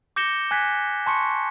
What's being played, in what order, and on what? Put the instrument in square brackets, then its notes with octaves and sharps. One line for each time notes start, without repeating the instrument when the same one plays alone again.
[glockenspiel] D6 G6 A#6 C#7 E7 G7
G#5 F#6 G#6 B6
A5 C6 C#6 C#7